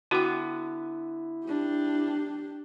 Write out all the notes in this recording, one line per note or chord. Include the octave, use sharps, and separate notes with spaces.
D3 B3 E4 F#4 G5
D4 G4